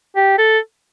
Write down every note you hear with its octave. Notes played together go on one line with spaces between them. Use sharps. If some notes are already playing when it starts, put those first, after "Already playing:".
G4
A4